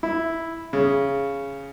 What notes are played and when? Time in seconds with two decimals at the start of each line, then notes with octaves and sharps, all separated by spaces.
0.03 E4
0.73 C#3